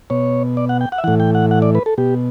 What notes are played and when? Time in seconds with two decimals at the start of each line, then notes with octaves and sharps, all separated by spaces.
0.10 B2 C#5
0.57 D5
0.69 F#5
0.81 G5
0.92 F#5
0.98 E5
1.04 A2 E3 F#5
1.20 G5
1.35 F#5
1.51 F#5
1.62 D5
1.75 B4
1.86 A4
1.98 B2 G4